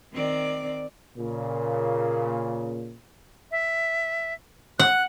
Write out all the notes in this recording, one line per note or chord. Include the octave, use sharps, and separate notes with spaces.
D#3 C4 D5
A#2 C#3
E5
F#5 F#6